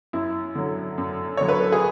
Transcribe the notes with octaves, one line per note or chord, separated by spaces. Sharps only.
F#2 E4
D3 F#3
F#2
D3 F#3 C#5
B4
A4
G#4